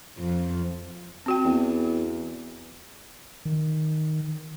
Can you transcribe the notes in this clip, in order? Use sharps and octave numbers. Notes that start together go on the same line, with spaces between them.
F2
C4 F#4 G5
E2
D#3